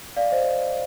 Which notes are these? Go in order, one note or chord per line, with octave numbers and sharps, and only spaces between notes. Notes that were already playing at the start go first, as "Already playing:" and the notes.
D5 F5
C5 D#5